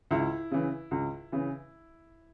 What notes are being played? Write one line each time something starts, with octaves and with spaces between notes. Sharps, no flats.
C#2 E4
C#3 E3
C#2
C#3 E3